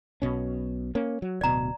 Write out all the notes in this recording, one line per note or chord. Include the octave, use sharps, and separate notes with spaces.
B1 B2 C#4
A#3 C#4
F#3
D1 B2 D5 A#5